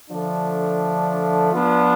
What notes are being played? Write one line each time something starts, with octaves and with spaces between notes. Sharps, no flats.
D3 F3 A3 D4
F3 B3 D4 F4